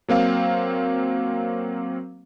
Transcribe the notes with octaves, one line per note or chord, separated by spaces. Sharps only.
F#3 A#3 C4 F5